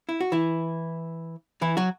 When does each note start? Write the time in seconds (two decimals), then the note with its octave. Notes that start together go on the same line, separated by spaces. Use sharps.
0.09 E4
0.21 F#4
0.32 E3 E4
1.62 E3 E4
1.77 F#3 F#4